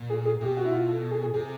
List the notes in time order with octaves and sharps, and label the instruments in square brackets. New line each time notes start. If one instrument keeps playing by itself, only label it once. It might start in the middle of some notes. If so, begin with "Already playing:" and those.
Already playing: [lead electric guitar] A#2
[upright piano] G#4
G#4
[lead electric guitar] B2 [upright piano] G4
[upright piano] F#4
E4
F4
A4
A4
G#4
G#4
[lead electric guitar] C3 [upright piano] G#4